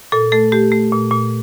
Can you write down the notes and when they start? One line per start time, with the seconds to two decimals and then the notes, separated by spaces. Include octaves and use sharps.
0.12 A#2 A4
0.32 A3 A4
0.52 A3 G4
0.72 A3
0.92 A#2
1.11 A#2